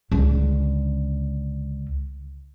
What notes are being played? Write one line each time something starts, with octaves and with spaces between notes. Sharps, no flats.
C#2 D3